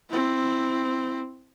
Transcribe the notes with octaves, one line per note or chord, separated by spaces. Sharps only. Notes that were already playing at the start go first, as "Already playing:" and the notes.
C4 E4